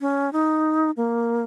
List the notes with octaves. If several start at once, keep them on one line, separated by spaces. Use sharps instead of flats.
C#4
D#4
A#3